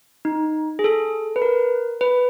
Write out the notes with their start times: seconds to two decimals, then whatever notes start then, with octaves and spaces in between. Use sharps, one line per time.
0.25 D#4
0.79 G#4
0.84 A4
1.36 B4
1.42 A#4
2.01 B4